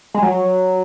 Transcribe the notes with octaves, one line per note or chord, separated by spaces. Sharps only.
G#3
F#3